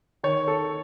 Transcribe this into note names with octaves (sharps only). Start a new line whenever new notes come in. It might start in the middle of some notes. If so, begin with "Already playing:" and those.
D#3 C#5
A4